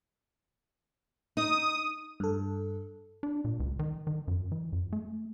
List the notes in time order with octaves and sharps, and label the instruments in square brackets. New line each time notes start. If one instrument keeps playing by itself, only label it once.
[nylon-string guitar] D#4 [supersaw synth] D#6
[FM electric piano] G2 A4
[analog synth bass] D4
A#2
C#2
D#3
D#3
F#2
E3
F#2
A3